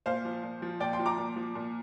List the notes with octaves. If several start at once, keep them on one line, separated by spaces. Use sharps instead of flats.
A#2 C5 F5
F3
A#2
F3
A#2 D5 G5
G5 C6
F3
A#5 D6
A#2
F3
A#2